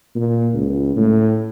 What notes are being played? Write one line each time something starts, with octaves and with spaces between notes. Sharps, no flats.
A#2
C#2
A2